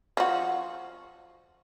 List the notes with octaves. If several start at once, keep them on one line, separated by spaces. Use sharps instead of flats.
F3 F#4